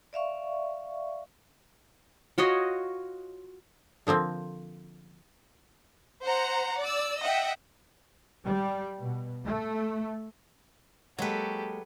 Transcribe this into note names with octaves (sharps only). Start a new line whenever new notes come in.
D5 E5 F5 C#6
F4 F#4 C#5 D#5
D3 F3 A#3 C4
C5 F#5 A#5
D5 E6
D#5 E5 F#5 G5
G3
B2
A3
F#3 G#3 A#3 F#4 G4 A4 B4